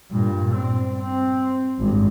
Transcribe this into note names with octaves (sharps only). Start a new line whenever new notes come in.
G2 A#2
C4
C4
G#1 G2